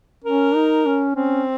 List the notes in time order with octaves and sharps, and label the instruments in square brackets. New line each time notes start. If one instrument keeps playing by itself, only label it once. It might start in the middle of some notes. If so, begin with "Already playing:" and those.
[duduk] C#4 [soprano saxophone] A#4
[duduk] D#4
C#4
[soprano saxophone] C4 [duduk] C#4